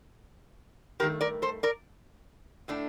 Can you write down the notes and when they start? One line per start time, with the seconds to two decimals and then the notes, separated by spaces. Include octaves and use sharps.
1.00 G2 D#3 A3 G4 A#4
1.21 A#4 D5
1.42 A4 C5
1.63 A#4 D5
2.68 A2 A3 D4